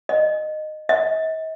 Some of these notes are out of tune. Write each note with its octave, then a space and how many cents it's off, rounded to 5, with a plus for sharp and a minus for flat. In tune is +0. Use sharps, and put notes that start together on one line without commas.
D#5 -15
D#5 +45